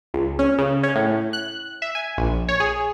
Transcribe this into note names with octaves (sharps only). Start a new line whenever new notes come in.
C#2
C#4
C#3
C#4
A2
F#6
E5
G#5
A#1
C#5
G#4